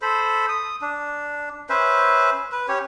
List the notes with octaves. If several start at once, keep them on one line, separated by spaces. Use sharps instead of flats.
A4 C5 B5
D#6
D4
C#4 B4 C5 E5
B4
C#4 G4 C#5